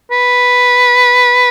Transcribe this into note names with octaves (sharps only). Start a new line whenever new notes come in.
B4